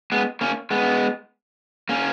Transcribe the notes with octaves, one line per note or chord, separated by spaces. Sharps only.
G#3 B3
A#3 C#4
G#3 B3
A#3 C#4